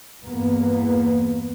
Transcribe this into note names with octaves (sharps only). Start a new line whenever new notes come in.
E2 G2 A#3 B3